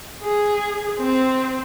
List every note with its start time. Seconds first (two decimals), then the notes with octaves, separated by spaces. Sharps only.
0.23 G#4
1.02 C4